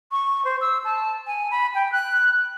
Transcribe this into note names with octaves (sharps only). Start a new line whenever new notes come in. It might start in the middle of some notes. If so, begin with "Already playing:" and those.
C#6
C5
E6
A5
G#5
B5
G5
F#6